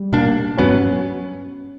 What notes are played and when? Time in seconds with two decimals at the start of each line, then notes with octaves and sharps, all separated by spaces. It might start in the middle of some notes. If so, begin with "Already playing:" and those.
Already playing: G3
0.13 B2 A#3 D4
0.58 G2 F#3 B3 C#4